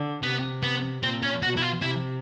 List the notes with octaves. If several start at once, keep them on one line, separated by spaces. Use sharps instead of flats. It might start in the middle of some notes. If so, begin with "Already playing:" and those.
Already playing: D3
C3 B3
B3
A#2 C4
C#4
B2 F#4
E4
F4
C3 E4